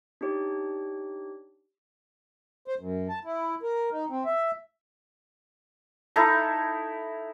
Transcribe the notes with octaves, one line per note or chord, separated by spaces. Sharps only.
D4 D#4 G4 C#5
C5
F#2
A5
E4
A#4
D#4
C4
E5
D#4 E4 A4 A#5